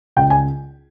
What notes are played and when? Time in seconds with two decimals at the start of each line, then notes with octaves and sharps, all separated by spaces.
0.17 C#2 G5
0.30 G#5